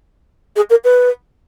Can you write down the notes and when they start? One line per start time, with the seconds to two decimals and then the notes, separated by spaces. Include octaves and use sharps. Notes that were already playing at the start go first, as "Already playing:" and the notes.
0.56 G#4
0.70 A#4
0.84 B4